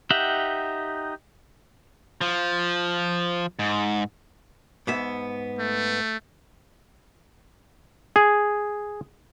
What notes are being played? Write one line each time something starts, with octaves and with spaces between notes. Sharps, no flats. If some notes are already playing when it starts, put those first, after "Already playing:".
D#4 G4 E5 F#5 G5
F3
G#2
G#2 B3 E5
A3
G#4